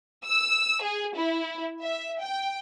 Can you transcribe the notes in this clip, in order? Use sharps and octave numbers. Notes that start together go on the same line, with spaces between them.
E6
G#4
E4
E5
G5